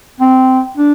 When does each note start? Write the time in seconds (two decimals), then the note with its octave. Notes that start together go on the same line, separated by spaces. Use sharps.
0.20 C4
0.77 D4